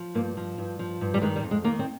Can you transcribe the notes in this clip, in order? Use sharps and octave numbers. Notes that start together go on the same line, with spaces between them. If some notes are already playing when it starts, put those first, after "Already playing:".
Already playing: F3
G2 A#3
F3
G2
F3
G2
G3
D#3 G#3
G3
F2
G#3
D#3 A#3
C4